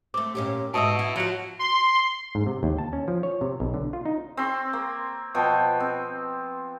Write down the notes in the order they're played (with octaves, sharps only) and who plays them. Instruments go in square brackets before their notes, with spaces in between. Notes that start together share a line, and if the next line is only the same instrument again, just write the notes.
[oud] A3 C4 [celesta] D6
[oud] A#2 C#4 G4
[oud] G#2 D#4 E5 [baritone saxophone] B2 [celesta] A5 D#6
[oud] E4
[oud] F3 F#4 [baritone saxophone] F#3
[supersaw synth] C6
[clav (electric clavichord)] G#2
C3
D#2
A5
C#4
F3
C#5
C3
B1
D3
F4
D#4
[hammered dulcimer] C4 C6 C#6
A#3
B2 F3 G5 C#6
C4